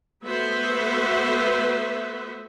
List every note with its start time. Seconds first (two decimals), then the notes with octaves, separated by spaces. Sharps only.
0.25 A3 B3 F#4 B4 C5 E5